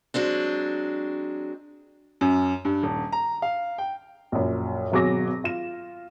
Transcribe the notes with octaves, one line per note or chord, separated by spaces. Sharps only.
F#3 G#3 C4 D4
F#2
G2
D#1
A#5
F5
G5
A#1 F#2
G#1 B2 F#3 G#4 D6 A#6
F4 E7